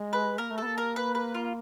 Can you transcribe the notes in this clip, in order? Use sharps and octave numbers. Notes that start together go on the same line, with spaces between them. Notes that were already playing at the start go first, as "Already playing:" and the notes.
Already playing: G#3
B4
A#3 A#4
A3
B3 A4
A#3
A#4
B4
B4
F4